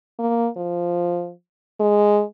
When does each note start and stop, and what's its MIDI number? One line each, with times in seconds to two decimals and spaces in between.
0.19 0.48 58
0.57 1.31 53
1.80 2.23 56